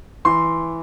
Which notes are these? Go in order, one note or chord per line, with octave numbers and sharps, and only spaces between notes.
E3 C6